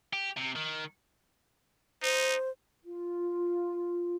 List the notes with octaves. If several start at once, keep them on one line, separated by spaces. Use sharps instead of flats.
G4
C3
D#3
D#4 C5
F4